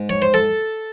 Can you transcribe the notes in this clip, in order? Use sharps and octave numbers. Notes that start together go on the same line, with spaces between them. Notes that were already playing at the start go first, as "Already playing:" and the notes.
Already playing: G#2
C#5
C5
A4